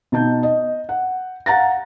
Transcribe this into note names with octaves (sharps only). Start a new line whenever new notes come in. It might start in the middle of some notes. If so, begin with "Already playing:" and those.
B2 D#4 A5 G6
D#5
F#5
F5 F#5 A#5 A6 A#6